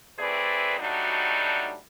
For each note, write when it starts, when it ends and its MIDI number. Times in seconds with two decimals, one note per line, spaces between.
0.19 0.77 52
0.19 0.77 57
0.19 0.77 60
0.19 0.77 68
0.19 0.77 71
0.19 0.77 74
0.78 1.75 54
0.78 1.75 55
0.78 1.75 57
0.78 1.75 62
0.78 1.75 63
0.78 1.75 66